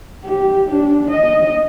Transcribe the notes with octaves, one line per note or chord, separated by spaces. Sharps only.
G4
D4
D#5